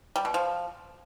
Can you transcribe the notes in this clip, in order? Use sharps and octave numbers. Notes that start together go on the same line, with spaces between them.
G3
B2
F3